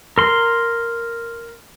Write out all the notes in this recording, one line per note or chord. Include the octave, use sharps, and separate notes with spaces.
A#4 C6